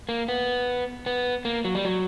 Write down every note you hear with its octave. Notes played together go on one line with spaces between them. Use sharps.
A#3
B3
B3
A#3
F#3
G3
F#3